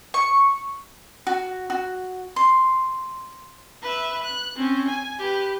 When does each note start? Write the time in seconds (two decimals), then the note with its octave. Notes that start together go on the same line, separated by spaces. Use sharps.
0.14 C#6
1.27 F#4
1.70 F#4
2.36 C6
3.82 B4 E5
4.23 F#6
4.56 C4 C#4
4.88 G#5
5.19 G4 B4